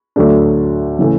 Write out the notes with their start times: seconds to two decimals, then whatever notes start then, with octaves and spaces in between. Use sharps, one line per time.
0.16 D2 D3 F#3 A3 D4
0.99 C#3 E3 A3